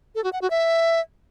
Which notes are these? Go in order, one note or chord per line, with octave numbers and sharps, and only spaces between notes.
A4
F#4
F#5
F#4
E5